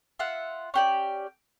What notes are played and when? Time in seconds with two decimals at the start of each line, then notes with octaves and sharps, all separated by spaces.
0.19 F4 E5 F#5
0.74 C#4 G4 D5